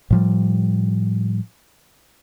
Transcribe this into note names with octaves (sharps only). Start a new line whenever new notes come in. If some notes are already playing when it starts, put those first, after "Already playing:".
A2 F3 G3